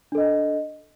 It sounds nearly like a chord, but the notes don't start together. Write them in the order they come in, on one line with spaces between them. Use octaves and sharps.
D4 A4 D#5